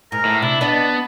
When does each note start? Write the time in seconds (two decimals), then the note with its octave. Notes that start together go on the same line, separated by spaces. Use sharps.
0.12 G#2 A#4
0.25 A2
0.42 C3 D4 E4
0.61 B3 D4 D#5 A5